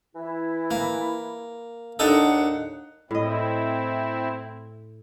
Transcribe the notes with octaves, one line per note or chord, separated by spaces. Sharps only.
E3 E4
A#3
D#2 D4 D#4 A4 F#5
A2 C4 E4 D#5